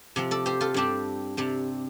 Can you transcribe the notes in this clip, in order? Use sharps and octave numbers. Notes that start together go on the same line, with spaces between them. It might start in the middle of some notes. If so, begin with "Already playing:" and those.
C3 F3 C4
A4 D5
G4 C5
F4 A4
G2 G3 C4 D4 G4
C3 G3 C4